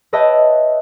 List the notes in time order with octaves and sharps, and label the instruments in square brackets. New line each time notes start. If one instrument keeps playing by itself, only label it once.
[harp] B4 C#5 D#5 E5 G5 A5